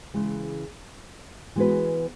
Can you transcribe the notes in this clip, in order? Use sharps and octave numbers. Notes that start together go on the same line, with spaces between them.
C#3 E3 G#3
E3 G#3 B3 F#4 B4